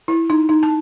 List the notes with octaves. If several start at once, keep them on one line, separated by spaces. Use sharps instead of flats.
E4
D#4
D#4
A5